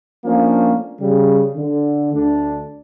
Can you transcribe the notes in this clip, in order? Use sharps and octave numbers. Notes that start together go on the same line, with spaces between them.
F3 A3 A#3 C#4 D4
C#3 G3
D3
D2 D3 A3 D4